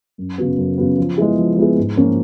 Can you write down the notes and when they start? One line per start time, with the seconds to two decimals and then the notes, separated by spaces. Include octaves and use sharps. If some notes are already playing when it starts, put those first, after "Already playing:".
0.18 F#2
0.38 C#3 F#3 B3
0.58 F#2
0.78 C#3 F#3 B3
0.98 F3
1.17 G#3 B3 E4 G#4
1.38 F3
1.57 G#3 B3 E4 G#4
1.78 G#2
1.97 F3 A#3 C#4 F4